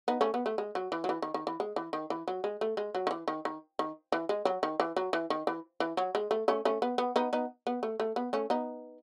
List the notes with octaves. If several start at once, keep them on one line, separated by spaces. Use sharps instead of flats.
B3 D#4
A3 C#4
B3
A3
G#3
F#3
E3
F#3
E3
D#3
D#3
E3
G#3
E3
D#3
E3
F#3
G#3
A3
G#3
F#3
D#3
E3
D#3
D#3
D#3
E3
G#3
F#3
D#3
E3
F#3
E3
D#3
E3
E3
F#3
G#3
A3
A3 C#4
A3 C#4
B3
B3
B3 D#4
B3 D#4
B3
A3
A3
B3
A3 C#4
B3 D#4